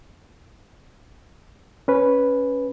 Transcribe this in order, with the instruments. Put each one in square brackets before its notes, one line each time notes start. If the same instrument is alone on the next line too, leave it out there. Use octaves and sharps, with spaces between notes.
[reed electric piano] C#4 B4